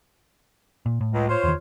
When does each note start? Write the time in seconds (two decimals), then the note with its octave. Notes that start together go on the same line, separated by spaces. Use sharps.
0.86 A#2
1.01 A2
1.12 C#2
1.28 F4 C5 C#5
1.44 E2 D#3